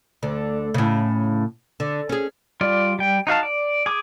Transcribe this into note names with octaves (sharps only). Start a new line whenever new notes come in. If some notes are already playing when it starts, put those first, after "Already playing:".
D2 D3
A2 C#3
D3
C#4 G#4
G3 F4 D5
G3 G5
D#4 F#4 F5 A5
D5
G#4 D6